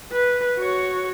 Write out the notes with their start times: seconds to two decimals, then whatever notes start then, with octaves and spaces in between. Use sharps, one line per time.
0.12 B4
0.58 F#4 C#5